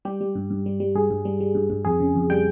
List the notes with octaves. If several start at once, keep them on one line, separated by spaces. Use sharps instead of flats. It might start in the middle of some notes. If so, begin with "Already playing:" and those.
G3 G4
G3
G2
G2
G3
G3
G2 G#4
G2
G3
G3
G2
G2
F2 G#4
C#3
F2
G3 G5